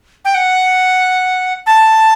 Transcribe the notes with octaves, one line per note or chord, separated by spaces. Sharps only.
G5
F#5
A5